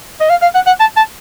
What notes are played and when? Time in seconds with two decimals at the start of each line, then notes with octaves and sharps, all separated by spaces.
0.21 D#5
0.30 F5
0.42 F5
0.55 F#5
0.67 F#5
0.80 A5
0.97 A5